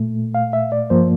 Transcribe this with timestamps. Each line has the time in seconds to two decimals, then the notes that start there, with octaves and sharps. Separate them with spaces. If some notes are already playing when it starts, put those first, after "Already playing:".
Already playing: A#2 A3
0.35 F5
0.53 E5
0.72 D5
0.90 G2 F3 A#3 C5